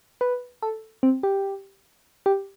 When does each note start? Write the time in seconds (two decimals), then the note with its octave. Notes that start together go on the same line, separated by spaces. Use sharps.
0.21 B4
0.62 A4
1.03 C4
1.23 G4
2.26 G4